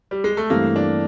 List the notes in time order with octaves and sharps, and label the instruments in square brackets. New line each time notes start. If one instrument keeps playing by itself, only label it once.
[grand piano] G3
G#3
A3
[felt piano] G2 E3 A3 C4 [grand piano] A#3
[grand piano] D4